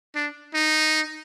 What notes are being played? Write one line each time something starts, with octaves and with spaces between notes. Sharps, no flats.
D4
D#4